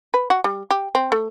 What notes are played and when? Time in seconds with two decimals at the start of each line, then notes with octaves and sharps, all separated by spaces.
0.14 B4
0.30 F#4
0.44 G3
0.71 G4
0.95 C4
1.12 A3